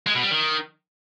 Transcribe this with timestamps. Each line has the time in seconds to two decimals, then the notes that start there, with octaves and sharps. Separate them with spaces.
0.06 G#3
0.15 B2
0.23 G3
0.31 D#3